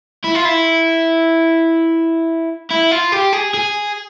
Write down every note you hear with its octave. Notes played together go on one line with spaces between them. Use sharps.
E4
F4
E4
E4
F4
G4
G#4
G#4